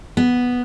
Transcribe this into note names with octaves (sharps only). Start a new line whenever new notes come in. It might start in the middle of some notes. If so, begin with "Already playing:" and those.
B3